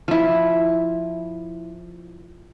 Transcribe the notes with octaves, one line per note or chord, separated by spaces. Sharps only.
F3 E4